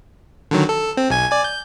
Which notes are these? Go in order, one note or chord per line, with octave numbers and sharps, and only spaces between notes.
D3 D#3 F#3
A4
C4
B1 G#5 G#6
D5 G#5
G6